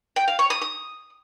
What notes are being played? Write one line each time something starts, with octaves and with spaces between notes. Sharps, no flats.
G5
F5
C#5
D#6
D#6